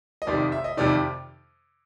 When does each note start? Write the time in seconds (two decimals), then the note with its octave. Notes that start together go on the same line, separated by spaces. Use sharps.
0.22 D#5
0.27 F2 C3 D#3 D5
0.52 E5
0.64 D#5
0.77 F2 C3 D#3 D5